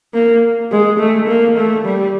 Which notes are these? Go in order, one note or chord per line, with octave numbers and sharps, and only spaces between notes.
A#3
G#3
A3
A#3
A3
G3